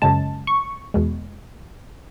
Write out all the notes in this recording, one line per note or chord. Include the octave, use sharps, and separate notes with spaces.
F#2 C#3 G#3 A5
C#6
E2 B2 G#3